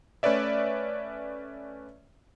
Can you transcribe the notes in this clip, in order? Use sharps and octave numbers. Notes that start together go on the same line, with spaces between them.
A3 C#4 B4 C#5 D5 E5